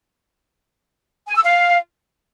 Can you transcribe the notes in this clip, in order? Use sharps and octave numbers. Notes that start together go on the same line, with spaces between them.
G#5
E6
F5